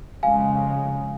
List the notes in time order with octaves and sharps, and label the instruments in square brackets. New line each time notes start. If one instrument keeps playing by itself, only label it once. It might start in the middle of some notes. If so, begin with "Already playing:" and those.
[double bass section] F2 C#3 G#3 [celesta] F5 G#5